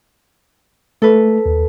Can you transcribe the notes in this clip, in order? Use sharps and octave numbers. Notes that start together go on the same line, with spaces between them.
A3 A4 B4
D#2